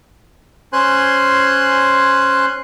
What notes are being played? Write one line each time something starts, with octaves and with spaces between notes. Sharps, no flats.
C#4 C5 G#5 C6 F#6